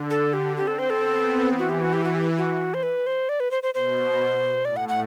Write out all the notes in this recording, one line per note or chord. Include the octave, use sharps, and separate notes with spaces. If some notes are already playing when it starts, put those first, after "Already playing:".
Already playing: D3
A4
G4
C4 G4
A4
C5
A4
B3
E3
F#4
G4
F#4
G4
F#4
G4
F#4
C5
B4
C5
D5
B4
C5
C5
B2 C5
A2 D5
F#5
F#5